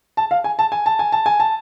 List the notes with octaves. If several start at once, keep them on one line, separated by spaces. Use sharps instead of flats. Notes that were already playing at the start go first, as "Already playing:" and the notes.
A5
F5
G#5
A5
G#5
A5
G#5
A5
G#5
A5